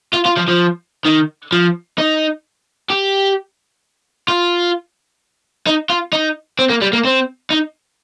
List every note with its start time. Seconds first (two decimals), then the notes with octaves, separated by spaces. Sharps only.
0.14 F4
0.26 F4
0.38 F3
0.49 F3
1.06 D#3
1.52 F3
1.98 D#4
2.90 G4
4.28 F4
5.67 D#4
5.90 F4
6.13 D#4
6.59 C4
6.70 A#3
6.82 G3
6.93 A#3
7.05 C4
7.50 D#4